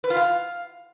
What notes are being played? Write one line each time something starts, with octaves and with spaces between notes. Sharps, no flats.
B4
F4
F5